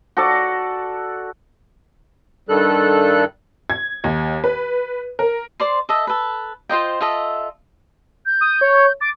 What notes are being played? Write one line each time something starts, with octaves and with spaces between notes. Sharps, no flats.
F#4 A4 D5
G2 D#3 G3 A4 F#6
G#6
D#2
B4
A#4
C5 D5 C6
A4 D#5 E5
A4 B4
F4 C5 D#5 G5
F4 A4 D#5 E5
G6
D#6
C#5
D6 A6